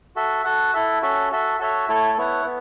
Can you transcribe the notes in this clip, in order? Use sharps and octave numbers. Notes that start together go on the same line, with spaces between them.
F#4 A4 E5
F#4 A4 F#5
E4 A4 E5
C#4 F#4 A4 E5
F#4 A4 E5
F#4 A4 C#5 E5
A3 E4 A4 C#5
B3 E4 C#5 F#5
B3